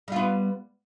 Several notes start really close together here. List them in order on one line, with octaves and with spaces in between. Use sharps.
G3 F4 B3